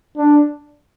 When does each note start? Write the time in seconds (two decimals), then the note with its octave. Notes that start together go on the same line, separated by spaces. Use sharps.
0.18 D4